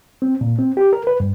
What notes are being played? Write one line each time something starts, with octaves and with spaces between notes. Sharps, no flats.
C4
A#2
C4
G4
A#4
B4
G2